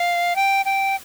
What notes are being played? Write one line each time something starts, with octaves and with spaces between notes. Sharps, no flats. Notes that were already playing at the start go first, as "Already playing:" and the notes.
Already playing: F5
G5
G5